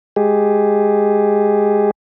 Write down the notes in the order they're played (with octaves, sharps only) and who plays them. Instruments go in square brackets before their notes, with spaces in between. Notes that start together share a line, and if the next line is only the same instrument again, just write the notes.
[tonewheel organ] G#3 G4 G#4